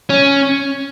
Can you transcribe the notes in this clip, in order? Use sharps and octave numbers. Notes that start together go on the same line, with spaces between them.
C#4